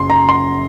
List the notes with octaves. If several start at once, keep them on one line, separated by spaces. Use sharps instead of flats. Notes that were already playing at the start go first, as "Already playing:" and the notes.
Already playing: F#1 F#2 C6
A#5
C6